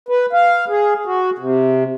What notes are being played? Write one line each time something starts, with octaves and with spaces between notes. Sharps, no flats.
B4
F5
G#4
F#4
C3